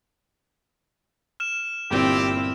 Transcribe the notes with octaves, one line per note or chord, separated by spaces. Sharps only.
F6 E7
G1 A#2 C4 E4 G4